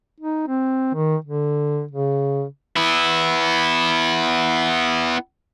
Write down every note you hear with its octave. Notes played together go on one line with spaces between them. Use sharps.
D#4
C4
D#3
D3
C#3
B3 E4